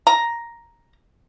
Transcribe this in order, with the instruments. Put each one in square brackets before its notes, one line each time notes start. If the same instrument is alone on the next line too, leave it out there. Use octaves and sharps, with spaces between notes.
[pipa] A#5